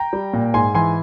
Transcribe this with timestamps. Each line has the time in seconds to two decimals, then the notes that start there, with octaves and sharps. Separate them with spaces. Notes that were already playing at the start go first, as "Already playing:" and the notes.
Already playing: G5 A#5
0.13 G3
0.33 A#2
0.54 G#2 G#5 C6
0.74 E3 G#5 C6